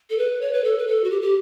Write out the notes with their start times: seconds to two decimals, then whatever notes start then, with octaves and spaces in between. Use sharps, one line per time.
0.10 A4
0.18 B4
0.41 C#5
0.53 B4
0.64 A4
0.78 B4
0.87 A4
1.04 F#4
1.10 G4
1.22 G4